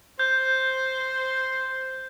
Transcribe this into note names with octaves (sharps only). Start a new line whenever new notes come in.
C5 G6